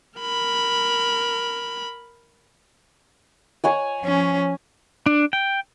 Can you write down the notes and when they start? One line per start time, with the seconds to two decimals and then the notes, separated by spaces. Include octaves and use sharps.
0.19 A#4 B5
3.64 C#5 F#5 G#5
4.01 F3 C#4
5.06 D4
5.33 G5